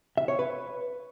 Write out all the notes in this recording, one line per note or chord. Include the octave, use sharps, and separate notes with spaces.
E5
C#5
B4